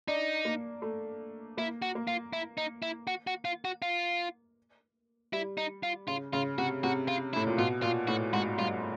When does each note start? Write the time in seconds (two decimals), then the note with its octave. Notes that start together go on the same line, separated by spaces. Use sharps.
0.07 D4 D#4
0.45 A#3
0.82 A3
1.57 A#3 E4
1.82 F#4
1.95 A#3
2.07 F4
2.33 E4
2.58 D#4
2.82 E4
3.07 F#4
3.27 F#4
3.45 F4
3.65 F#4
3.82 F4
5.33 G3 E4
5.58 D#4
5.83 F4
6.08 C#3 F4
6.33 C#3 F4
6.58 C3 F#4
6.84 C3 F#4
7.08 F4
7.33 E4
7.36 A2
7.47 A#2
7.58 B2 F4
7.82 A#2 F4
8.08 A2 F#4
8.33 G#2 F#4
8.58 G2 F4